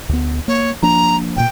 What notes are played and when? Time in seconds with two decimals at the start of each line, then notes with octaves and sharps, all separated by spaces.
0.09 D2 B3
0.48 A#3 C#5
0.82 F3 A#3 D4 A#5
1.36 D1 A#2 G5